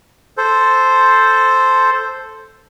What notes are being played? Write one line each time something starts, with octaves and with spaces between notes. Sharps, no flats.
A4 C5